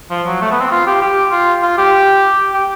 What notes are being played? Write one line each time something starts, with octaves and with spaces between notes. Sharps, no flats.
F3
F#3
A3
B3
C4
F4
G4
G4
F4
F4
G4
G4